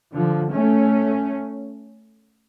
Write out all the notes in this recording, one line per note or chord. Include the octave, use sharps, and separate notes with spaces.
D3 F3
A3 C#4